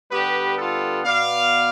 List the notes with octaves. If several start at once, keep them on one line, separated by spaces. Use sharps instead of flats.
D3 G3 B3 G4 B4
F4 A4
B2 B3 D5 F5